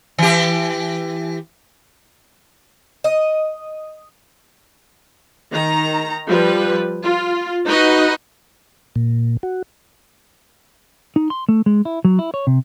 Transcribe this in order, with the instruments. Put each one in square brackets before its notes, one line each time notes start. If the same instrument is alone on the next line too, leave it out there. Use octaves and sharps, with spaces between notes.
[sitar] E3 G4
[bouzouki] D#5
[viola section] D#3 A#5
F3 G3 B4
F4
D#4 F#4 B4 D#5
[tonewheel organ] A#2
F#4
[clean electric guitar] D#4
C6
A3
G#3
E4
F#3
E4
C#5
C3